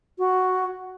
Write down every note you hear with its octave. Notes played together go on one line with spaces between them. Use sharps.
F#4